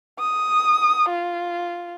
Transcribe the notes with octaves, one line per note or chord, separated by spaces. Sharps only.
D#6
F4